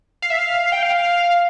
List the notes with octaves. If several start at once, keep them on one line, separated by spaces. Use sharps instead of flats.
F5
E5
F5
G5
F5